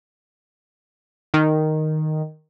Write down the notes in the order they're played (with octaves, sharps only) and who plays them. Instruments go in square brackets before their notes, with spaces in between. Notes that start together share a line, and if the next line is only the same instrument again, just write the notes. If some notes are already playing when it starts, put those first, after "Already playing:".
[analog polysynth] D#3